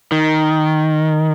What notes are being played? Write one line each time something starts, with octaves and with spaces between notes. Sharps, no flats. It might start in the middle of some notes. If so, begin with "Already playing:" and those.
D#3